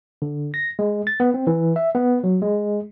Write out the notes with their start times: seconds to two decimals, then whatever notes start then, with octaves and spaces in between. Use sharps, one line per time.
0.22 D3
0.54 A#6
0.79 G#3
1.07 A6
1.20 B3
1.34 C4
1.47 E3
1.76 E5
1.95 B3
2.24 F#3
2.42 G#3